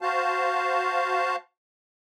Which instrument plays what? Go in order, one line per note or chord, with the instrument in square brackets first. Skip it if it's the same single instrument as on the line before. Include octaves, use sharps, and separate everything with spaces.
[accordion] F#4 C5 F5 A5